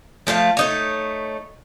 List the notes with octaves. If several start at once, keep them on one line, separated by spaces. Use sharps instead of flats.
F3 A3 E5 F5
A3 D#4 C#5